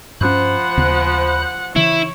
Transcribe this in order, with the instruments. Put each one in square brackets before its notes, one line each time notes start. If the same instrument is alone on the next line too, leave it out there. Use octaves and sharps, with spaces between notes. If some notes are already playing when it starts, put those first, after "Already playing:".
[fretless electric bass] G2 C#4 [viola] F3 F#5 [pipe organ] C5 B5 F#6
[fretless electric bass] D#2 C#3 B3
[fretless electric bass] C#3 E3 [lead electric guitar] E4 [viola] C#5